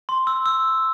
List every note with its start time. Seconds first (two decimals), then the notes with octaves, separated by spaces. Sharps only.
0.09 C6
0.27 E6
0.46 E6